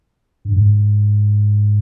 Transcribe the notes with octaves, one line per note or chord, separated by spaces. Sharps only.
G2
G#2